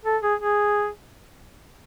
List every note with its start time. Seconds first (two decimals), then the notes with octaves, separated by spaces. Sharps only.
0.05 A4
0.23 G#4
0.40 G#4